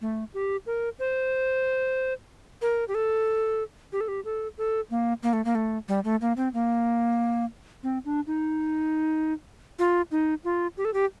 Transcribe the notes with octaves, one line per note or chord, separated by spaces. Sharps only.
A3
G4
A#4
C5
A#4
G4
A4
G4
A4
G4
A4
A4
A#3
A#3
A3
A#3
A3
G3
A3
A#3
C4
A#3
C4
D4
D#4
F4
D#4
F4
G4
A4
G4